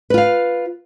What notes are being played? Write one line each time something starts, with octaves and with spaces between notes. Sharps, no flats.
F4 B4 F5